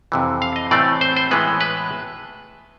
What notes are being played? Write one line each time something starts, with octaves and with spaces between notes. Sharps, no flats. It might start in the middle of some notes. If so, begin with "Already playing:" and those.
F2 C3 E3
F5
D#5
A2 E3 A3 C4 D5
C5
C5
A2 E3 G#3 B3 B4
B4